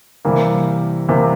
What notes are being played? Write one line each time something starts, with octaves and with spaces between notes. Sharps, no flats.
C3 E3 G3 A#3
C3 E3 G3 A#3